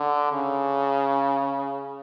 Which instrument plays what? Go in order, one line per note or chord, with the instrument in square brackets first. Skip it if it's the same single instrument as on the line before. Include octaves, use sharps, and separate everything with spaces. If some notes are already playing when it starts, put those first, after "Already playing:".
Already playing: [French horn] D3
C#3